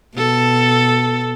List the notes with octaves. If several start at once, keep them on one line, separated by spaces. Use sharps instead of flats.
B2 A4